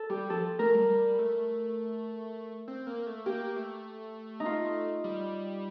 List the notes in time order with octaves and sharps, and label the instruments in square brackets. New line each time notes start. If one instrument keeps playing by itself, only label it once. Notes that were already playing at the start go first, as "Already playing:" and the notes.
Already playing: [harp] A4
[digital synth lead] G3 [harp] G4
[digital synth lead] F3 [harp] A4
[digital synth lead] A3 [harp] A#4
[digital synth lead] G3
G3
A3
C4
A#3
A3
[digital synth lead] A#3 [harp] G4
[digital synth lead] A3
[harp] D#4
F4
[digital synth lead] G3